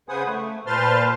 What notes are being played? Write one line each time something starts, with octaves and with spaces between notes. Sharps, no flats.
C#3 B4 C5 F#5 G#5 D#6
A3
A#2 B4 C5 A5 C6 F6